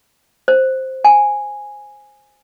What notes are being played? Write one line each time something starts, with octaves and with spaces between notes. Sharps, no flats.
C5
G#5